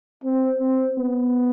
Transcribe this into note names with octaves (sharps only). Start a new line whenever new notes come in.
C4
C4
B3